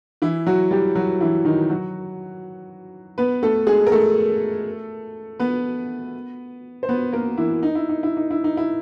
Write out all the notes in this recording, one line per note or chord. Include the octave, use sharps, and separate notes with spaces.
E3 E4
F#3 F#4
G3 G4
F#3 F#4
E3 E4
D#3 D#4
F#3 F#4
B3 B4
A3 A4
G#3 G#4
A#4
A3 A4
B3 B4
C5
B3 B4
A#3 A#4
E3 E4
D#4
E4
D#4
E4
D#4
E4
D#4
E4